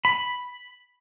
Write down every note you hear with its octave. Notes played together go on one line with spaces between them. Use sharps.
B5